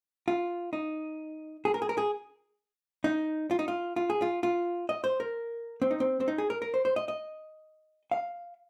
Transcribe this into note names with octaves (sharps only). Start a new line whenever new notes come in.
F4
D#4
G#4
A#4
G#4
A#4
G#4
D#4
F4
D#4
F4
F4
G#4
F4
F4
D#5
C5
A#4
C4
D#4
C4
C4
D#4
G#4
A#4
A#4
C5
C5
D#5
D#5
F5